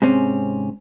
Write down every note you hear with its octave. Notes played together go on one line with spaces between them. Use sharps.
G#2 C3 C4 C#4